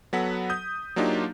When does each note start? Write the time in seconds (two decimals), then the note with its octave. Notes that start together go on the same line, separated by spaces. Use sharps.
0.13 F#3 B3 A4 F#5 B6
0.50 D#6 G6
0.96 F#3 A#3 D4 D#4 F4 G4